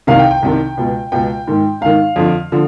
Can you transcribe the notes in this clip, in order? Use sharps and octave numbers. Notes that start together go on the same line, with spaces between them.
C2 C3 D#3 F5
G5
G5
C2 C3 D#3
C#2 B2
C#2 B2 G5
G#2 D#3
G#2 D#3 F5
F2 D3 F3
D3 F3